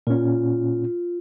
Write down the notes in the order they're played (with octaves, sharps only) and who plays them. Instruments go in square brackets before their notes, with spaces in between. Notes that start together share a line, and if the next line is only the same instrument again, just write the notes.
[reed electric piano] A#2 C#4 [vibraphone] F4